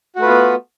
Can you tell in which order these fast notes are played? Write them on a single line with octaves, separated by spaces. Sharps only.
F#4 A3 B4 F4 B3